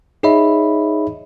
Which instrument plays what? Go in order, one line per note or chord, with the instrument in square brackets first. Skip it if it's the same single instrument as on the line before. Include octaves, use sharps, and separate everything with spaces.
[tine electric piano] D#4 G#4 C#5 D#5 E5 B5